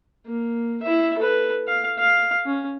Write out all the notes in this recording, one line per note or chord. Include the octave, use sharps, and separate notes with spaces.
A#3
E4 E5
A4 B4
F5
F5
C#4